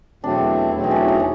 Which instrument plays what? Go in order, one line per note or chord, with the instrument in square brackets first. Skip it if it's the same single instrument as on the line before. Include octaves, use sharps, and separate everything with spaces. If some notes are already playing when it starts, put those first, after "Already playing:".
[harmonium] E2 B2 F#3 A3 C4 [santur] D4
[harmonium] E2 B2 F#3 A3 C4 [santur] E4
[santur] D#4
C#4 D4
D#4
C#4